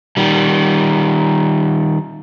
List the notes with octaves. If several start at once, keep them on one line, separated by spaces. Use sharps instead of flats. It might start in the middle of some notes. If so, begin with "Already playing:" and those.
D#3 G3